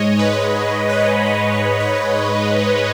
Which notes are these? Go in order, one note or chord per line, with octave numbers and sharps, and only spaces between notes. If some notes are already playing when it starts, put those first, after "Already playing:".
Already playing: G#2 G#3 C#5 D#5
G#2 B4
G#3
B4
G#2 C#5
D#5
G#3
C#5
G#2 C#5